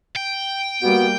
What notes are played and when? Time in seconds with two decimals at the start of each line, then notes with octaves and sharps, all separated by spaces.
0.16 G5
0.82 G3 A#3 B3 F#4